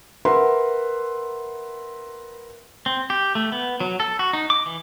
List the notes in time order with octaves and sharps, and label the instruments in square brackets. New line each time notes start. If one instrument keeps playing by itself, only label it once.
[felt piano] A#4 B4 E5 F#5 C6
[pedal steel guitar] C4
G4
A3
B3
F#3
A4
F#4
D#4
D6
E3